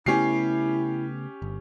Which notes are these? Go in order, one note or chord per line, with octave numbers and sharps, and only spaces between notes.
C#3 A3 B3 C#4 E4 G4 C7
G1